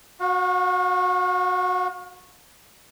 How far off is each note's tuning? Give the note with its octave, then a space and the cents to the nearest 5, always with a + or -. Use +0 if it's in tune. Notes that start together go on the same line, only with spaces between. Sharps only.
F#4 -20 F5 +40